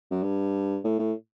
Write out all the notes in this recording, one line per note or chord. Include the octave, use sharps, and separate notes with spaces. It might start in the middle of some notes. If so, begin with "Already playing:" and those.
F#2
G2
A2
A2